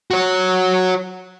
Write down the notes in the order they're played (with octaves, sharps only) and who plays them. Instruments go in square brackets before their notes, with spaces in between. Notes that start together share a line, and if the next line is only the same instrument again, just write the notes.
[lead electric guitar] F#4 C#5